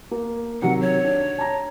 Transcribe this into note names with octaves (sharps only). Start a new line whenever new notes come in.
A#3
C3 D#3 F#3 F#5
C#5
D4
A5 A#5